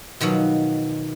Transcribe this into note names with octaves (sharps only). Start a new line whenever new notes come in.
B2 D#3 F3 F#3